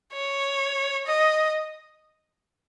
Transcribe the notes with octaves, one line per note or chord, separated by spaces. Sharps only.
C#5
D#5